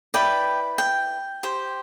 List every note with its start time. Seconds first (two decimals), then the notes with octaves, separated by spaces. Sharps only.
0.14 E4 B4 D5 G5
0.78 G5
1.43 G4 C5